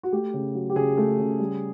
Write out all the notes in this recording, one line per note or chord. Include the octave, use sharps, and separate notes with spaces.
F#4
A3 G4
C#3
F#3
G4
C#3 G#4
A3
C#3
G3